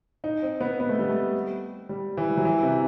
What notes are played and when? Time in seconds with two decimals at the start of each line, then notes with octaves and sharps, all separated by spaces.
0.24 D#4
0.42 C4
0.61 B3
0.80 B3
0.89 A3
0.99 G3
1.09 A3
1.89 G3
2.17 E3
2.29 G3
2.37 F#3
2.45 E3
2.63 C3